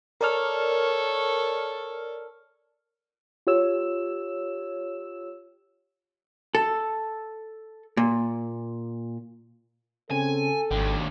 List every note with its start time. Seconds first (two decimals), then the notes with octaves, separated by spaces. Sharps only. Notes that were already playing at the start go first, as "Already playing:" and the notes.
0.21 A4 A#4 C#5 D5 F6
3.47 F4 G4 C#5 E6 E7
6.55 A4
7.97 A#2
10.10 C#3 C4 C#4 A4 G#5
10.71 G#1 D#2 D3 G5